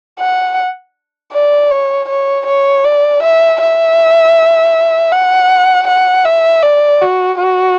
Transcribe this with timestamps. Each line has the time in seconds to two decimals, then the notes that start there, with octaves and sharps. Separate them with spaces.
0.19 F#5
1.32 D5
1.71 C#5
2.09 C#5
2.46 C#5
2.84 D5
3.23 E5
3.60 E5
5.12 F#5
5.87 F#5
6.25 E5
6.63 D5
7.01 F#4
7.38 F#4